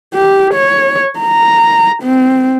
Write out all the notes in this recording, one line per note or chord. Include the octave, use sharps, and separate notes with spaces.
G4
C#5
A#5
C4